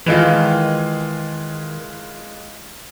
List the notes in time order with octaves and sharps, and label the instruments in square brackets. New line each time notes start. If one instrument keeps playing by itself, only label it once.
[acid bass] D#3 [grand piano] E3 G#3 F4